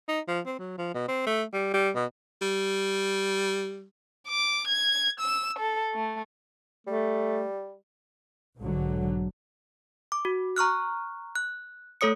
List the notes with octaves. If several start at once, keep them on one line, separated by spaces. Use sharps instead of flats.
D#4
F3
C4
F#3
F3
B2
C4
A3
G3
G3
B2
G3
D6
G#6
E6
A4
A3
G3 A3
B1 G#2 D3 F#3
D6
F#4
A#5 C#6 F6 F#6
F#6
A3 A4 C#5 D#6 C#7